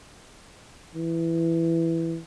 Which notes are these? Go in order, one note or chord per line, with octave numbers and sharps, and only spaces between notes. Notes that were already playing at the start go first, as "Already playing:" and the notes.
E3